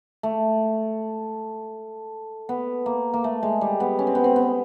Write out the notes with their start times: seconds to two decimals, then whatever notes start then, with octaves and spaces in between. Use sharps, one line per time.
0.23 A3
2.49 B3
2.86 A#3
3.14 A#3
3.24 A3
3.43 G#3
3.61 G3
3.80 B3
3.99 C#4
4.07 C4
4.15 B3
4.24 C4
4.36 B3